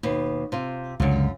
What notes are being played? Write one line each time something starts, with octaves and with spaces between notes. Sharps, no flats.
D#2 B2
C3 F4
C#2 F#2 D3 F4